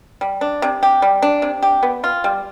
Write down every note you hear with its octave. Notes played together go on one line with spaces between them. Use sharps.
G3
D4
C3
G4
G3
D4
C3
G4
B3
F4
G3